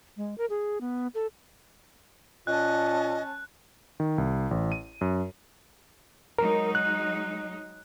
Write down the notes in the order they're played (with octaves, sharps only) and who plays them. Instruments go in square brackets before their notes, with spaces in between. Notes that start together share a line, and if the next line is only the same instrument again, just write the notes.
[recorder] G#3
A#4
G#4
B3
A4
[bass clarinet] A#2 [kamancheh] C#4 A5 [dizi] D#5 [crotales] F#6
[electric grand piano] D#3
C2
A1
D#7
F#2
[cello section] F#3 G#3 D#4 [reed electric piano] A#4
[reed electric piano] F#6